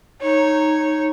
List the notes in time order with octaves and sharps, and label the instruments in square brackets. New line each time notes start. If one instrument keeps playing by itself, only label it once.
[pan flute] D#4 [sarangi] C#5